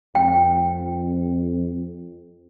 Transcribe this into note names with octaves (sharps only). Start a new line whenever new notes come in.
F2 G5